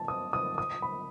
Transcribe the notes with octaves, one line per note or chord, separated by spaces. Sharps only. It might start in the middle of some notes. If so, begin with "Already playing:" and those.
Already playing: A5
D#6
D#6
D#6
B5